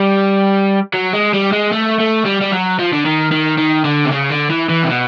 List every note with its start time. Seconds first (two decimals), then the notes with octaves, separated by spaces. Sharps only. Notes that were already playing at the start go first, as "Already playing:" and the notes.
Already playing: G3
0.94 F#3
1.13 G#3
1.34 G3
1.53 G#3
1.73 A3
2.00 A3
2.26 G3
2.42 G3
2.52 F#3
2.79 F3
2.93 D3
3.06 D#3
3.32 D#3
3.58 D#3
3.84 D3
4.05 C3
4.11 C#3
4.30 D3
4.50 E3
4.70 E3
4.84 C3
4.90 B2